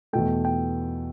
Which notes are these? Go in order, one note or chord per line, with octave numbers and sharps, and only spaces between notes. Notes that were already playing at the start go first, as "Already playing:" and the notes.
E2 B2 A3 G5
G5